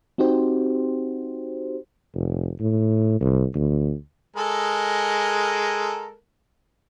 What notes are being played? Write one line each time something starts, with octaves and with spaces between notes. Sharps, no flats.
C4 D#4 F#4 G4 C5
F1
A2
C2
D2
G#3 A4 A#4